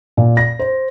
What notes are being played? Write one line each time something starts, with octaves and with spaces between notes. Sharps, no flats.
A#2
A#6
C5